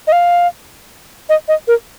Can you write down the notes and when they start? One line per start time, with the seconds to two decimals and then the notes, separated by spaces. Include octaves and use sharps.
0.07 D#5
0.12 F5
1.29 D#5
1.48 D#5
1.68 A#4